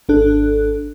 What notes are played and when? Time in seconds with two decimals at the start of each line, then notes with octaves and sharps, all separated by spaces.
0.09 G#1 D4 A4 F#6